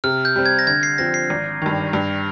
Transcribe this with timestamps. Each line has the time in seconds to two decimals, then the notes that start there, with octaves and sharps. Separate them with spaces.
0.04 C3 F6
0.25 G6
0.36 G3 C4
0.46 G#6
0.59 A#6
0.67 D3 G#6
0.83 C7
0.98 F3 C4 A#6
1.14 C7
1.30 G#1
1.62 G2 D#3
1.93 G2